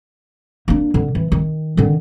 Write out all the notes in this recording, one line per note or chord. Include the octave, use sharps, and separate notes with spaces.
A#3 D4
D3
E3
D#3
D3 D#3